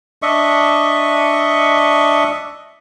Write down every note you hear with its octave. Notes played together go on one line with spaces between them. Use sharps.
D4 D#5 E5 C#6